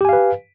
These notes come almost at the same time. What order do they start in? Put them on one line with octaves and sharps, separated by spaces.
G4 G#5 F5 B4